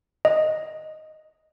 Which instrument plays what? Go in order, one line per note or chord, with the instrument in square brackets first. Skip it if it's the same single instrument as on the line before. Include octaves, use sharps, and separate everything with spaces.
[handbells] D#5